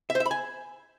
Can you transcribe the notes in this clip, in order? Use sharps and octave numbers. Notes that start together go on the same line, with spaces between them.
E5
C5
E5
B5
G#5